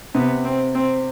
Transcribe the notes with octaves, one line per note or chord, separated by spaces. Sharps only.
C3 B3
C4
C4